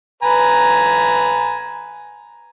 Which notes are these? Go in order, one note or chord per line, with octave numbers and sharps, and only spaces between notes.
B4 G#5 A#5